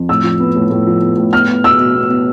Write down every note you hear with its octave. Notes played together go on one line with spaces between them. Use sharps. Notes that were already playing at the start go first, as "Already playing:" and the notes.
Already playing: F2
A2 E6
F3
B3
A2
A2
F3
B3
A2
B3 F6
B3
B2 E6
B2
B3
B3